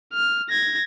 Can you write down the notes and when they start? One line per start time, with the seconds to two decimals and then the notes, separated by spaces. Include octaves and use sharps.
0.14 F6
0.50 G#6 A#6